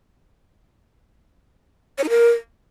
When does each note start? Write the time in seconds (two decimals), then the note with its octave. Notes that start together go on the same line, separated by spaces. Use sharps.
1.98 C#5
2.04 D#4
2.09 A#4